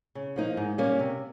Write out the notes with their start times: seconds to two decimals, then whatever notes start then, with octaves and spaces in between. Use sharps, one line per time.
0.15 C#3
0.36 F3 A#3 D#4
0.57 G#2
0.78 G3 A#3 C#4
1.00 C3